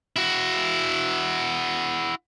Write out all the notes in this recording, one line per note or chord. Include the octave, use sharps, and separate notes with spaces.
E4 F#4